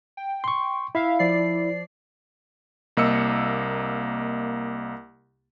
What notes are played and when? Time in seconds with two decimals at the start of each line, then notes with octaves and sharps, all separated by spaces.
0.17 G5
0.44 C6 C#6
0.95 E4 E5 F5
1.19 F3 D5 C7
2.97 C2 A#3 D#5 E6 C#7